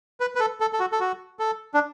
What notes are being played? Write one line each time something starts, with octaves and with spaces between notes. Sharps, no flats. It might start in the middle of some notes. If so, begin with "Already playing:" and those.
B4
B4
A4
A4
A4
F#4
A4
F#4
A4
D4